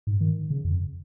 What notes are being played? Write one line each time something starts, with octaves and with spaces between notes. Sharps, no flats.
G#2
D#3
C#3
F2